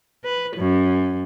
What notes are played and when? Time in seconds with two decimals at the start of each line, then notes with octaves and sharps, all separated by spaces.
0.24 B4
0.57 F#2